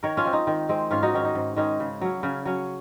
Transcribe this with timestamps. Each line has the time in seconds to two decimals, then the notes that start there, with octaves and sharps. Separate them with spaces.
0.03 D#3 A#4 C#5
0.17 C#4 F4
0.25 G#3 C4
0.33 D#4
0.47 D#3
0.69 G#3 C4
0.91 G#2 C#4 F4
1.03 D#4 F#4
1.14 D#3 G#3 C#4
1.25 D#4
1.35 G#2
1.57 D#3 G#3 C#4 D#4
1.80 C#3
2.01 F#3 C#4
2.23 C#3 C#4
2.45 F#3 C#4